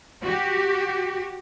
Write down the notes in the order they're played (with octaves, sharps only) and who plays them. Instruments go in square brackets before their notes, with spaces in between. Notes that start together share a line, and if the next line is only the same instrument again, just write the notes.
[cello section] F#4 G4